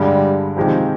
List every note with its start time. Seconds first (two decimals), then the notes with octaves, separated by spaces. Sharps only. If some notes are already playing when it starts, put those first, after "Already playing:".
Already playing: G2 D3 G3 G#3
0.57 C3 D#3 F3 G#3 D#4 G4